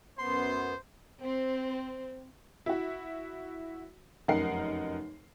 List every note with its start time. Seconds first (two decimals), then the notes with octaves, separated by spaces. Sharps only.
0.19 F#2 B3 C5 C6
1.21 C4
2.66 E4 F#4
4.28 F1 F#2 D#4 A#4 F#5 C7